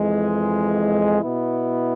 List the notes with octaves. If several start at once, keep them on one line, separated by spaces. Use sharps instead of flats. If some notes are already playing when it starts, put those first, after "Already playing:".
Already playing: F2 E3 G#3
B2 B3 E4